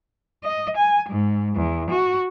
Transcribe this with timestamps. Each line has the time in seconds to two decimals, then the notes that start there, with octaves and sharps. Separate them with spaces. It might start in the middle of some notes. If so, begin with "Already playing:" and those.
0.43 D#5
0.75 G#5
1.08 G#2
1.53 E2
1.90 F#4